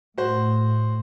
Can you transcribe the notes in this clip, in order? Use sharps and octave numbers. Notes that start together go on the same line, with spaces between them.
A2 F#4 C5